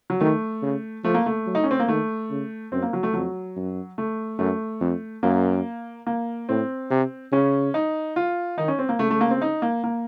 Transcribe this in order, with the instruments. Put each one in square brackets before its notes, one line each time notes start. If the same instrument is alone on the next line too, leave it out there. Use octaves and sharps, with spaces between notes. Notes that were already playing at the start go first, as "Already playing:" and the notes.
[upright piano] F#3
[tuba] D#3 [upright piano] A3
[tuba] C#3
[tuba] F3 [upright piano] A3
[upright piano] A#3
A3
[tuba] F#3
[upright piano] D#4
C#4
C4
A#3
[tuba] D#3 [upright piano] A3
[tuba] C#3
[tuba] F#2 [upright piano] C4
[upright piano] A#3
F#3
A3
[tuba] F2 [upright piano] F#3
[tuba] F#2
[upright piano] A3
[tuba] F#2 [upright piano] A3
[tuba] F2
[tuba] F#2 [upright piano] A#3
[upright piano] A#3
[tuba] A2 [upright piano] C4
[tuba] C3
[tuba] C#3 [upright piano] C#4
[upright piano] D#4
F4
[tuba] D#3 [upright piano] D#4
[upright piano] C#4
C4
A#3
[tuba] C#3 [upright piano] A3
[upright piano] A3
A#3
C4
D#4
A#3
A#3